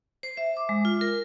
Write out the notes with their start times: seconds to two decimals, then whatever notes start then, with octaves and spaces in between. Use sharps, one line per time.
0.23 C5
0.37 E5
0.57 D6
0.69 G#3
0.85 F4
1.01 A#4